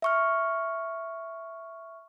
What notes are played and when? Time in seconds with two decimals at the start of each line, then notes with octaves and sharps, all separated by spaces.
0.02 E5 C#6 F6